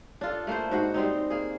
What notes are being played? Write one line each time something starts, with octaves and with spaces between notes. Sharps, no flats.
D4 F4 A4
A3 A#3 E4 C5
G#2 F#4 C5 F#5
G3 G#3 C4 D#4
A#3 G#4